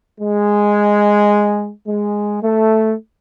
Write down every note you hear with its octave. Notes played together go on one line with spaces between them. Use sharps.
G#3
G#3
A3